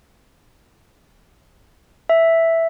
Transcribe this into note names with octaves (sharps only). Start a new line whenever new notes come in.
E5